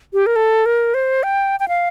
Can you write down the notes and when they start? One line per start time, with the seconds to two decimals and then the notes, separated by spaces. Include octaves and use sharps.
0.14 G4
0.26 A#4
0.36 A4
0.66 A#4
0.94 C5
1.23 G5
1.60 G5
1.68 F5